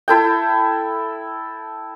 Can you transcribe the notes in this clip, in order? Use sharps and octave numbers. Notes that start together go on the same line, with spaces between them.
E4 A4 G5